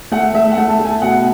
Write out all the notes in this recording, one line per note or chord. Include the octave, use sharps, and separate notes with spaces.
A3 F#5
A3 E5
F#5
A3
A5
A3
G#5
B2 F#5